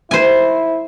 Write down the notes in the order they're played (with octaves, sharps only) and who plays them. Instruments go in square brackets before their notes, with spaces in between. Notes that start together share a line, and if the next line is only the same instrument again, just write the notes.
[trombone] E4 [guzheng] C5 G#5